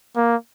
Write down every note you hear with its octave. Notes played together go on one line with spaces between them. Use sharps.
A#3